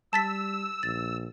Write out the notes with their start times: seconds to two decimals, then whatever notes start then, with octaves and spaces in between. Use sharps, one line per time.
0.13 G3 A5 E6 A6 B6
0.83 A#1 A6